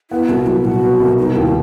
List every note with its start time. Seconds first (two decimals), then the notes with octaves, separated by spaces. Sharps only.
0.11 B3 E4
0.28 C2 F#4
0.46 F#3 E4
0.65 B2 F#4
0.82 B3
1.00 C2
1.17 B3 D#4
1.35 D#2 E4